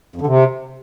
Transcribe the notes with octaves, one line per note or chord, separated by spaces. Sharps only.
F2
D3
C3